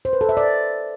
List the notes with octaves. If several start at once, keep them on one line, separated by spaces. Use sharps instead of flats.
C5
B4
A4
E5
D5